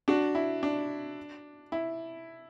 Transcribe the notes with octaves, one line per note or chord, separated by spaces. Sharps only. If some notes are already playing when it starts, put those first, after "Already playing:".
D4 F#4
E4
D4
E4